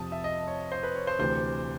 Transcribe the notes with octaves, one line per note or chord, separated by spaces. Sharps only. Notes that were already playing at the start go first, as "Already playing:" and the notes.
Already playing: F2 C3 F3 A5 D#6
E5
D#5
C#5
C5
B4
C#5
C5
D2 C3 E3 C5